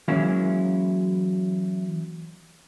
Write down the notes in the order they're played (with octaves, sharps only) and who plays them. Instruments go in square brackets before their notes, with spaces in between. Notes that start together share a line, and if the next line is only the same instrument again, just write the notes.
[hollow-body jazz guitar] E3 F#3 G#3 A#3 C#4 E4